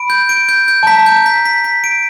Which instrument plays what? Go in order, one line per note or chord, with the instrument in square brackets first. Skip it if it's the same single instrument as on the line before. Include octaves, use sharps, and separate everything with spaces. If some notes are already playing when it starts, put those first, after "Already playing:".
Already playing: [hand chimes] B5 [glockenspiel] D7
[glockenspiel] G6
D7
G6
G6
[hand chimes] A5
[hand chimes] A#5 [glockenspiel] B6
[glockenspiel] G6
B6
B6
B6
D7